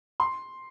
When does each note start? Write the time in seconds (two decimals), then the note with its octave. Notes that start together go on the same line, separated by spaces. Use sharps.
0.20 C6